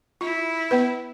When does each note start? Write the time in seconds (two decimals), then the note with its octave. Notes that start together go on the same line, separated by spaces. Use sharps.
0.21 E4 F4
0.71 B3 B4